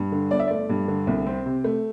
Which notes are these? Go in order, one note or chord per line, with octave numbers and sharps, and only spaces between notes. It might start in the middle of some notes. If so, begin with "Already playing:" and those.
Already playing: G2
D3
G1 D5
E5
A3 D5
G2
D3
C2
C4
C3
A3